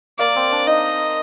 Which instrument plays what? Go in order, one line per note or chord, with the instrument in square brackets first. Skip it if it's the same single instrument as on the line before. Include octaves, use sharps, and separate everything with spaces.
[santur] A#3 [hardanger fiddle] D5
[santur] C4
D4
[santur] D#4 [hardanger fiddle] D#5